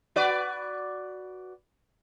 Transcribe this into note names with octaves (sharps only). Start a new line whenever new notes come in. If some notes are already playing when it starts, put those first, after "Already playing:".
F#4 B4 D5